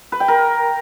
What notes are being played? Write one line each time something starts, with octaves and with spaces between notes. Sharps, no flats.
B4
G5
A#4